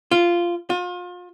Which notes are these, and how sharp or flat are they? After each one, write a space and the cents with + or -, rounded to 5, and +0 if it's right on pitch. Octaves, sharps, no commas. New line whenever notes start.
F4 -10
F4 +35